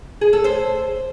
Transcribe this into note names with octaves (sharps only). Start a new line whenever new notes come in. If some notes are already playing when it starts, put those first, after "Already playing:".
G#4
A4
C5